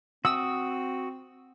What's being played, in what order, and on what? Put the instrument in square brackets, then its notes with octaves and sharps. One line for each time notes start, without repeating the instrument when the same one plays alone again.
[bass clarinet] C4 [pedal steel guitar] F#4 D#6 [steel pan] E6